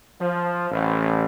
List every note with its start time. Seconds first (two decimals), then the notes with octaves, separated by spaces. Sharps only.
0.19 F3
0.70 A1